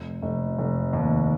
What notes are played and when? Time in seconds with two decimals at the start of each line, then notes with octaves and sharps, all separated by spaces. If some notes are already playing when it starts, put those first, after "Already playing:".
Already playing: F1
0.22 F1
0.58 F1
0.93 D#2